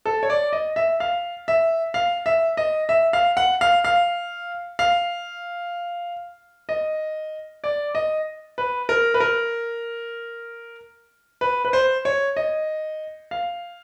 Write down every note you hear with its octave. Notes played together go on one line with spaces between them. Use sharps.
A4
C#5
D5
D#5
E5
F5
E5
F5
E5
D#5
E5
F5
F#5
F5
F5
F5
D#5
D5
D#5
B4
A#4
B4
A#4
B4
B4
C5
C#5
D#5
F5